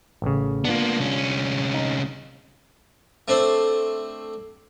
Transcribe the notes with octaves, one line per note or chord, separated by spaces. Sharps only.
A1 C#3
A#3 B3 D4 F4
C2 C#4
D#4
A3 C4 D4 C5